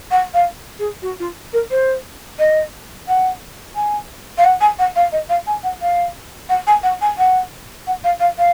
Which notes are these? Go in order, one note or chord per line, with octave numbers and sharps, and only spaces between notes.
F#5
F5
G#4
F#4
F4
A#4
C5
D#5
F#5
G#5
F5
F#5
G#5
F#5
F5
D#5
F5
G#5
F#5
F5
F#5
G#5
F#5
G#5
F#5
F#5
F5
F5
F5